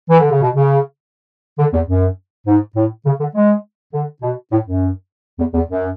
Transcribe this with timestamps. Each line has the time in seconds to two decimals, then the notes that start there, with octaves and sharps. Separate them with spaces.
0.10 E3
0.20 D3
0.31 C#3
0.42 B2
0.56 C#3
1.59 D3
1.73 E2
1.88 F#2
2.47 G#2
2.76 A2
3.05 C#3
3.20 D3
3.35 G#3
3.93 D3
4.22 B2
4.52 A2
4.67 F#2
5.39 E2
5.54 E2
5.69 F#2